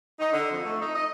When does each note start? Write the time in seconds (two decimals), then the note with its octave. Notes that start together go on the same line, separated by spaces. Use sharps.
0.19 D#4
0.32 D3
0.51 F2
0.65 A3
0.80 D#4
0.95 D#5